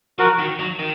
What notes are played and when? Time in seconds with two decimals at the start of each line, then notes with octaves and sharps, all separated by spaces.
0.19 F3 F#4 A#4
0.39 D#3
0.60 F#3
0.79 D#3